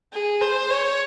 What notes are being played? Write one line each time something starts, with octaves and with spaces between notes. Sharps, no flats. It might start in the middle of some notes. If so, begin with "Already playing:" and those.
G#4
C5
C#5